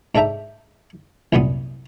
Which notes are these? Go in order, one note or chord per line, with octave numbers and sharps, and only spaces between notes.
G#2 D4 A4 E5 G5 A#5
C2 F#2 A#2 G3 B3 D#6